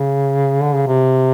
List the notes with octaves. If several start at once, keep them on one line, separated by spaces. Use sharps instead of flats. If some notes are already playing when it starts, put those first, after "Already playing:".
Already playing: C#3
D3
C#3
C3